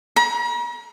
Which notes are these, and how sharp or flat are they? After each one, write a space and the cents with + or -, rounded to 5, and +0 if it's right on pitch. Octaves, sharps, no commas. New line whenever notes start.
A#5 +45